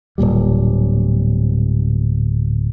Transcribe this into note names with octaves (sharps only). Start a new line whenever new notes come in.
D1 G#1 A#2 G3